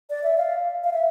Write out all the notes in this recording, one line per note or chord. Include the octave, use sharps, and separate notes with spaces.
D5
E5
F5
F5
E5